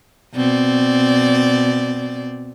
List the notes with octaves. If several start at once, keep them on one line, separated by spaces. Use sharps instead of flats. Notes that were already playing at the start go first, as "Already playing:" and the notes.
B2 C4 D5